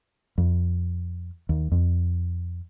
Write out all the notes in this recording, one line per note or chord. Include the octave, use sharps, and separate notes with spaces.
F2
D#2
F2